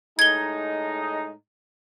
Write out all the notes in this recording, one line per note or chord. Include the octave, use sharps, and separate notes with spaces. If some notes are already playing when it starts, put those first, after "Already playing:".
A2 G#3 D#4 G#6 G7